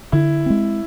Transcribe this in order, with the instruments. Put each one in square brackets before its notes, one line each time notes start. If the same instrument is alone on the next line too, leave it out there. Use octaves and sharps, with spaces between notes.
[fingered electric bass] D3 [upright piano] E4
[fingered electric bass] G#3 C4